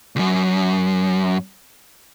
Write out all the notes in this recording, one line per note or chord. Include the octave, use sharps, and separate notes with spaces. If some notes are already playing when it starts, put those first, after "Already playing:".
C#2 F#2